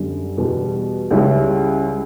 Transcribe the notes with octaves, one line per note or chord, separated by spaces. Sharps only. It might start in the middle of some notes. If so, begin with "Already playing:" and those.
Already playing: F#2 D3 G3 B3 D4
E2 B2 G3
C#2 C#3 G3 C#4 E4